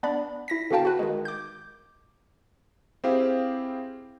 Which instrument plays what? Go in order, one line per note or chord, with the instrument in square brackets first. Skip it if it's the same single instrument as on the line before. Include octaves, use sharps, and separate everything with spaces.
[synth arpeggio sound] B3 D4 D5 B5
E4 A#6 B6
D3 B3 F#4 F5 G5 A5
F#4 B4
D#3 G#3
D6 G6
[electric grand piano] C4 E4 G4 G#4 C5 F5